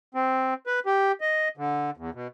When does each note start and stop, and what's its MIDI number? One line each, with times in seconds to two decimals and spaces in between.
0.15 0.54 60
0.67 0.80 71
0.86 1.12 67
1.21 1.48 75
1.57 1.90 50
1.97 2.10 40
2.14 2.27 47